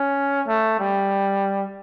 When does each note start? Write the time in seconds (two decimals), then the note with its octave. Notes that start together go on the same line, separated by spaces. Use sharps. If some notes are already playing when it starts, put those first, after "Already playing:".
Already playing: C#4
0.48 A3
0.79 G3